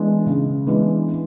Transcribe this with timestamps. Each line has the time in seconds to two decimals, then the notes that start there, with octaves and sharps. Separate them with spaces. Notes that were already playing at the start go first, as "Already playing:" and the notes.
Already playing: E3 G#3 B3 D4
0.26 C#3
0.67 E3 G#3 B3 D4